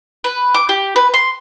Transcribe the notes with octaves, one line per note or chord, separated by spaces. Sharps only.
B4
D6
G4
B4
C6